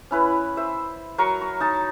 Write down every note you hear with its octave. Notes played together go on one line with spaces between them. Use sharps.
C#4 E4 B4
C5 E5
F#3 A#4 C#6
C#6
D#4 A5